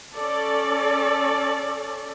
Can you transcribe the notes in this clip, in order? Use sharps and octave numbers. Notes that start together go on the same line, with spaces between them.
C#4 A4 D5